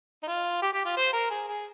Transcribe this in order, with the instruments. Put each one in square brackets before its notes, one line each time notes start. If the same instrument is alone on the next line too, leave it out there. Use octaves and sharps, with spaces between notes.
[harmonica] D#4
F4
G4
G4
F4
C5
A#4
G#4
G#4